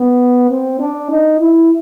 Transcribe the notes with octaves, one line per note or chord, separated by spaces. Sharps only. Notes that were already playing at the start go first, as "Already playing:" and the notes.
Already playing: B3
C4
D4
D#4
E4